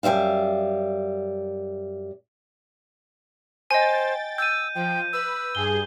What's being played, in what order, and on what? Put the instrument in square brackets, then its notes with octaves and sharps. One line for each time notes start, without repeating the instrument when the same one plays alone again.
[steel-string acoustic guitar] F#2 C#3 G3 E5 F5
[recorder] C5 [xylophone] D#5 G#5 [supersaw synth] G5 A6
[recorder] E6 [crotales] G6 D#7
[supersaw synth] F3 [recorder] G5
[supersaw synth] B4 [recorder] E6
[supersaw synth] G2 G#4 [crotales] G7